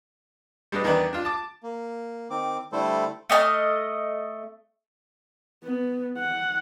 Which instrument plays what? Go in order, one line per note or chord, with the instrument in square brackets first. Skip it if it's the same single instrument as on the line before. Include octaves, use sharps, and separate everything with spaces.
[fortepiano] G3 G#3 D4 B4 D#5
E2 D#3 B3 D4 B4 D5
D4 F4
A5 D6
[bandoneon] A#3
D#3 C4 D6
D3 G3 A3 E4 A4 C5
[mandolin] A3 D#5 A5 F6
[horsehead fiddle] B3
F#5